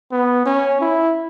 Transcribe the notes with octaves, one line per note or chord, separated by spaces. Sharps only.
B3
C#4
E4